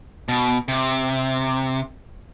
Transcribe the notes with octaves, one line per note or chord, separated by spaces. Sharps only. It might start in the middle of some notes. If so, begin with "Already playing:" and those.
B2
C3